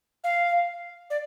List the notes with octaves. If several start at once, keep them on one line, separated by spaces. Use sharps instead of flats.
F5
D5